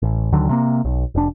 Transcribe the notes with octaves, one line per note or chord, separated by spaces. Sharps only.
A1
D2 D3 D#3 F#3
C3 A3 A#3
B1
F1 D4